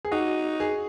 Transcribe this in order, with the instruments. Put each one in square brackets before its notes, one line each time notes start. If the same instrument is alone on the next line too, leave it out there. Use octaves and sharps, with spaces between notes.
[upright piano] G#4
[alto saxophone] D#4 [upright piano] F#4
[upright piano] G#4